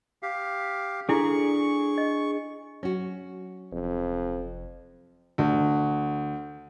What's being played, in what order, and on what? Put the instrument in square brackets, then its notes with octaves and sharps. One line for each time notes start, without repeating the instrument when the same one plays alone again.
[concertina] G4 F5
[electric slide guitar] D4 G#4 [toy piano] E4 A4 [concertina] C#6
[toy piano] D#5
[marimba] F#3 [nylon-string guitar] C#4 F#4
[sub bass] F1 [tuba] F2
[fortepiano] D2